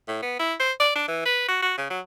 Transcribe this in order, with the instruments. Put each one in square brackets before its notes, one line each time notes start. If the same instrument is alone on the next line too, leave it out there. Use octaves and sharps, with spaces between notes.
[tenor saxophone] A2
B3
E4
C5
D5
D4
E3
B4
F#4
F#4
C#3
F#3